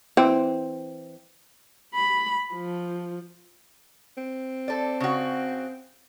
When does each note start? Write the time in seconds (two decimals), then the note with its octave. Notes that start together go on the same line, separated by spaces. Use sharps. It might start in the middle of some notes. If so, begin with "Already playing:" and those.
0.17 E3 C4
1.94 B5
2.53 F3
4.17 C4
4.68 A4 D5
5.00 C#3 F#4